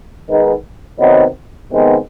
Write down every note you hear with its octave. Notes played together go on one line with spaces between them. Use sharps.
D#3 G#3 B3 D#4
C3 D#3 F#3 B3 D#4
C3 D#3 G#3 B3 D#4